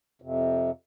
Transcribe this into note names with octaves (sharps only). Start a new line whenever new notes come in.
F2 C3